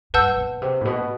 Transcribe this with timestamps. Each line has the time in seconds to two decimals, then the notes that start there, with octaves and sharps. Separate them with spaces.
0.14 G2 B4 F#5 A5 E6 G6
0.38 B2
0.62 C3
0.81 A2
0.85 B2